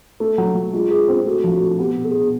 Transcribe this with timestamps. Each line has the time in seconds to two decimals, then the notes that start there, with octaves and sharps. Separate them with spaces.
0.20 A3
0.38 F#3
0.55 F#3
0.73 G#3 F4
0.91 G#4
1.08 C4
1.26 A3 F#4
1.44 F3
1.61 A3
1.79 B3 G4
1.96 B2
2.05 A4
2.08 G#4
2.14 B2